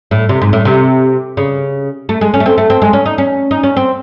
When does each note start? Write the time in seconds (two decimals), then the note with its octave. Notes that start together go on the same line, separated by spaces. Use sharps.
0.11 A2
0.29 C3
0.42 G#2
0.53 A2
0.65 C3
1.37 C#3
2.09 A3
2.21 G#3
2.34 C#4
2.40 A3
2.46 C4
2.58 A3
2.70 C4
2.82 G#3
2.93 C#4
3.06 D#4
3.18 C#4
3.51 D#4
3.63 C#4
3.76 C4